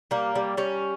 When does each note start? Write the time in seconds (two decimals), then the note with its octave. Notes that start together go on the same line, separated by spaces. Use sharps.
0.11 G3 A#3
0.35 G3
0.57 G3 C#4